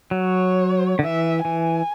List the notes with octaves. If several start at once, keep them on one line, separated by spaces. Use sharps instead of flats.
F#3
C#5
D3
E3 E5
E3 G#5